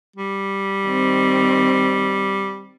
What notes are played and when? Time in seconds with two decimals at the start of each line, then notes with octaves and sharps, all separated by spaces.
0.16 G3
0.84 D#3 C4